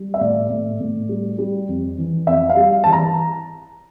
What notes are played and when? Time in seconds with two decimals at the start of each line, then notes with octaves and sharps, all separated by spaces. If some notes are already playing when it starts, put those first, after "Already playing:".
Already playing: G3
0.14 E5
0.21 A2 D5
0.50 A2
0.80 A2
1.09 G3
1.38 G3
1.69 F2
1.98 E3
2.27 F2 E5
2.49 F5
2.57 G3
2.84 E3 A5
2.93 A#5